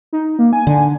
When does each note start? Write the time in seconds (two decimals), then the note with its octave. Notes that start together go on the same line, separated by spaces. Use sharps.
0.13 D#4
0.39 A#3
0.53 G#5
0.67 D3